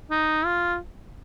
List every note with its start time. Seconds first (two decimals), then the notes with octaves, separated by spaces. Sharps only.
0.11 D#4
0.46 F4